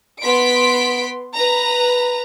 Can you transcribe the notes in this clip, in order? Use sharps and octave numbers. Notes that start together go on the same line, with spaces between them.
B3 C6 B6 D7
B4 A#5